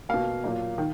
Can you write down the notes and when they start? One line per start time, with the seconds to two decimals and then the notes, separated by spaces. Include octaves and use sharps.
0.09 B2 A#3 F5
0.44 A#2 F#3 A#3
0.78 D#3